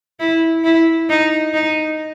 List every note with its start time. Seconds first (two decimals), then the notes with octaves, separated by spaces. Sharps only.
0.20 E4
0.64 E4
1.09 D#4
1.54 D#4